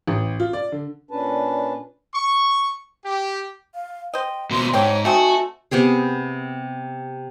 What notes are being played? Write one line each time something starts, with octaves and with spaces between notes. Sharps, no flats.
A1
F4
D5
D3
A#2 C#4 D4 B4 A5
C#6
G4
F5
C5 D#5 G5
D#2 B2 C6
G#2 C4 D4 G4 C#5
A3 C4 D#4 F#4 G#5
C3 B3 G4 G#4